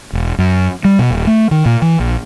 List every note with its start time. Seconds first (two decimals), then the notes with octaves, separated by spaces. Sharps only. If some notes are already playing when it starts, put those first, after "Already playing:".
0.13 E1
0.38 F#2
0.85 G3
0.99 B2
1.10 D#1
1.27 A3
1.51 D#3
1.66 A#2
1.82 E3
2.00 A#1